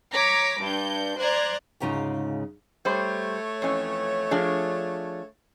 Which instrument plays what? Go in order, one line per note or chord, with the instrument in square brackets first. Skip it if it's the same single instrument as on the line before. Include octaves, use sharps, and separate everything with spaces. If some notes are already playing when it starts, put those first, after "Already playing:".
[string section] C#5 A#5 D6 B6
G2 D4 G6
C5 D5 A#5 F#6 G#6
[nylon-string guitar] D2 G#2 C#3 G#3 D#4 F4
[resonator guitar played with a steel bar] G3 C5 [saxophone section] A3 C#5
[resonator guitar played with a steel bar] F2 E3 C#4
F3 D4 G#4